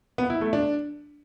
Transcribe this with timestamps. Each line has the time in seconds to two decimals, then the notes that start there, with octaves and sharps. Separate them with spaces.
0.18 B3
0.30 E4
0.41 A3
0.53 D4